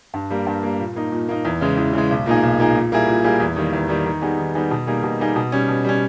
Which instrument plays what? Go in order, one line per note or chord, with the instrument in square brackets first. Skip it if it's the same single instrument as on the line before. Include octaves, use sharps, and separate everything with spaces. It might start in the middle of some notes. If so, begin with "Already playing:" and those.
[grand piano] G2
G3 A#3
G2
G3 A#3
A#2
A#3 D#4
A#2
A#3 D#4
E2
C#3 E3 G#3
E2
C#3 E3 G#3
B1
A#2 A#3 D#4 G#4
B1
A#2 A#3 D#4 G#4
A#2
G3 A#3 E4 G#4
A#2
G3 A#3 E4 G#4
E2
D#3 G3 A#3
E2
D#3 G3 A#3
D#3
G3 B3 D#4 G#4
D#3
G3 B3 D#4 G#4
B2
G3 A#3 D#4 G#4
B2
G3 A#3 D#4 G#4
B2
G3 C#4
B2
G3 C#4